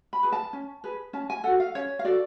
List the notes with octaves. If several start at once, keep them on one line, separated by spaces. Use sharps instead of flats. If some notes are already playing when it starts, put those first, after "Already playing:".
B5
G#4 B4
A5
C#4
G#4 B4
C#4 A5
G#5
F#4 A4 F#5
F5
C#4 C#5
F5
F#4 A4 D5